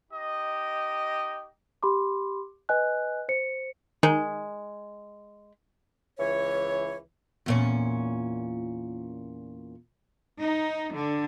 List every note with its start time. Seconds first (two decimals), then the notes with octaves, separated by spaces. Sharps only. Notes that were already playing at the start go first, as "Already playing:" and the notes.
0.11 D#4 G4 D#5
1.83 G4 B5 C6 D6
2.69 B4 D#5 G#5 F#6
3.29 C5 C#7
4.03 D#3 G#3
6.19 C#2 E3 C#5
7.46 E2 A#2 C#4
10.39 D#4
10.92 D3